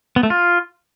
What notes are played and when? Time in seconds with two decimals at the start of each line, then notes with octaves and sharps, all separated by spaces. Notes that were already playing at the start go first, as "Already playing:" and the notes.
0.16 B3
0.23 A3
0.30 F4